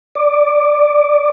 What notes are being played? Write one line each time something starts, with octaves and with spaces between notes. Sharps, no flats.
D5